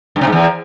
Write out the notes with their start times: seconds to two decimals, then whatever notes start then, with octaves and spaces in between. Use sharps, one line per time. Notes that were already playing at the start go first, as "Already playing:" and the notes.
0.16 G2
0.21 C3
0.27 G#2
0.32 E2